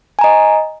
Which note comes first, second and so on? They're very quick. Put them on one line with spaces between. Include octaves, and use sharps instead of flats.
G#5 A#5 D#5